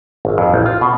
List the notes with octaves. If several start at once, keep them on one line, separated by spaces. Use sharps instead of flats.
G#1
F2
A1
F4
B2